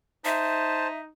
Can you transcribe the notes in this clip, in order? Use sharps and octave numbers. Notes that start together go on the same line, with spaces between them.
D#4 C5 E5 A5